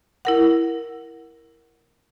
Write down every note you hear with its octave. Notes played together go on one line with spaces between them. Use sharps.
E4 A#4 F#5